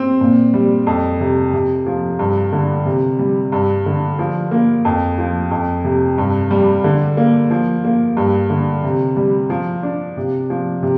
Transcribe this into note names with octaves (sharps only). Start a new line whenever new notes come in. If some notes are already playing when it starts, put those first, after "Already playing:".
Already playing: C4
A#2
G3
F2
C3
C3
F3
G2
D3
C3
G3
G2
D3
F3
A#3
F2
F3
F2
C3
G2
G3
D3
A#3
F3
A#3
G2
D3
C3
G3
F3
D4
C3
F3
C3